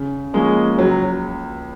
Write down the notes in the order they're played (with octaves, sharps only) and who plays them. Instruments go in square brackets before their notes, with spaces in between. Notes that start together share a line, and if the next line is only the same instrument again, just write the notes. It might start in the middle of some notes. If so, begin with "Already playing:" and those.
Already playing: [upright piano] C#3
[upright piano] F3 A#3 C#4 G#4 [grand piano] G#3
[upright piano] C#2 [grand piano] F#3